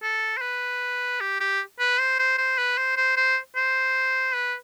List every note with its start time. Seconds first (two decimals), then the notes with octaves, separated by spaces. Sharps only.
0.03 A4
0.37 C5
0.41 B4
1.21 G4
1.40 G4
1.79 B4
1.99 C5
2.19 C5
2.38 C5
2.58 B4
2.78 C5
2.97 C5
3.17 C5
3.56 C5
4.35 B4